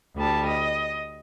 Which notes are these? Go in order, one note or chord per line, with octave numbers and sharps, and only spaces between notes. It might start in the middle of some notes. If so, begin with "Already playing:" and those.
D2 G3 A5
D#5